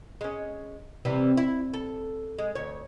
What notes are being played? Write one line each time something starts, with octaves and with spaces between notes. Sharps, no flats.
G#3 C#4
C3 E3 G3
E4
A4
G#3
D2 C#5